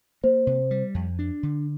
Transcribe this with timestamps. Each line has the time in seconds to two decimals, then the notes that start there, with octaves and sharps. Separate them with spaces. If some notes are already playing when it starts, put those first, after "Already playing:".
0.24 A#3 C5
0.47 C3
0.71 G3
0.95 F2
1.19 D4
1.43 D3